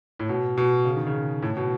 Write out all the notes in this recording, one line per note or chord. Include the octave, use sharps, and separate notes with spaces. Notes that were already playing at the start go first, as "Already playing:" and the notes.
A2
B2
B2
C#3
D#3
C#3
A2
B2